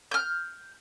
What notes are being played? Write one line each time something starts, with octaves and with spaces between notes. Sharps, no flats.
F6 G6